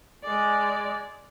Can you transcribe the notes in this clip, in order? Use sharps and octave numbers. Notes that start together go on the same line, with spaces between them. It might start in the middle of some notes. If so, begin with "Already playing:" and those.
G#3 D5